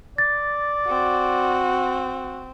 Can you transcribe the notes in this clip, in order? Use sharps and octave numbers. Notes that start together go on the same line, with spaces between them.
D5 A6
C4 F#4